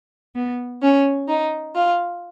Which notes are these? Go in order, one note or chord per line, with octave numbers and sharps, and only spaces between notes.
B3
C#4
D#4
F4